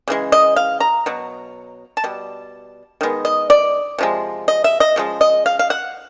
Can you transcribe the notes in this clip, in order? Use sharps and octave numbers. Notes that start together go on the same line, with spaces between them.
C#3 E3 G#3
D#5
F5
A#5
B2 F#3
A5
B2 G3
D#3 G#3 B3
D#5
D5
C3 F3 G#3
D#5
E5
D#5
C#3 F3 G#3
D#5
F5
F5
F#5